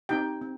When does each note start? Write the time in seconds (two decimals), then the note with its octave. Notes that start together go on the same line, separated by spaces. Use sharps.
0.09 C4 D#4 G4 G5
0.41 C4